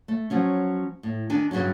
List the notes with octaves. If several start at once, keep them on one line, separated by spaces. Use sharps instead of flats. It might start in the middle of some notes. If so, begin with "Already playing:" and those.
A3
F3 F#3 C#4
A2
D#3 D4 G#5
G2 A#2 C#3 F#3